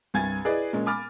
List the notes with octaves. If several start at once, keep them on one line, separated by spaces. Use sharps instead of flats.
C2 G2 G#5 G#6 A6
E4 G#4 B4 D5 D#5
A#2 G#3 C#4
G#5 B5 D6 F6 A6